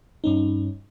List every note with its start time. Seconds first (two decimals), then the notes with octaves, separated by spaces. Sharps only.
0.24 G2 C#4 D#4